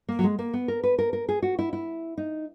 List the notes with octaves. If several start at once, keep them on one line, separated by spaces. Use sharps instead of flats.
A#3
F#3
G#3
A#3
B3
A#4
B4
A#4
A#4
G#4
F#4
E4
E4
D#4